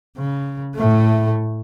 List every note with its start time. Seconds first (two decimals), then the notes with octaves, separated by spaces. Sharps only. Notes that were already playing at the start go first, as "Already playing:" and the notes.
0.17 C#3
0.75 A2 A3